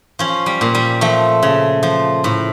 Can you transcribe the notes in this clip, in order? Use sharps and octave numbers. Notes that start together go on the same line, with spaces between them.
F3 C#4
G3
A#2
G3
F3 A3
C#3
F3
A2